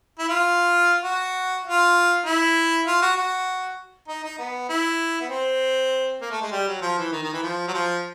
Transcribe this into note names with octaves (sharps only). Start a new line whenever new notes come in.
E4
F4
F#4
F4
E4
F4
F#4
F#4
D#4
D#4
B3
E4
B3
C4
A#3
A3
G#3
G3
F#3
F3
E3
D#3
D#3
E3
F3
F#3
F3